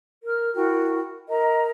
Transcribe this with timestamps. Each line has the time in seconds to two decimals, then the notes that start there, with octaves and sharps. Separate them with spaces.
0.25 A#4 F6
0.55 E4 F#4 A#4 G5
1.29 A#4 D#5 A#5